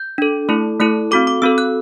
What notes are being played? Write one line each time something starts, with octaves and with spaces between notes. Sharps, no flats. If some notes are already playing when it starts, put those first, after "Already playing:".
Already playing: G6
D4 A4
A3 E4 A4
A3 E4 A4 F#6
C4 F#4 A4 D6
D6
C4 F#4 A4 E6
F#6